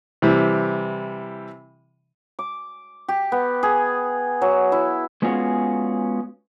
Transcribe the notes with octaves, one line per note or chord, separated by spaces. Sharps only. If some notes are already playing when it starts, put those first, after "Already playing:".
C3 E3 G3
D6
G4
B3
G#4
F#3
E4
G#3 B3 C#4 F4 F#4 G#4